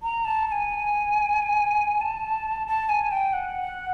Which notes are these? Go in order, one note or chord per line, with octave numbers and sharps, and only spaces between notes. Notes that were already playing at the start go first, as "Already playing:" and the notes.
A#5
A5
A5
G#5
A5
A5
G#5
G5
F#5